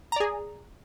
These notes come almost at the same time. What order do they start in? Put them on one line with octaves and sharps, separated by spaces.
A#5 D5 G#4